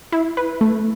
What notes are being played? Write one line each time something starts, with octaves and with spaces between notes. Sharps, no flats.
E4
B4
A3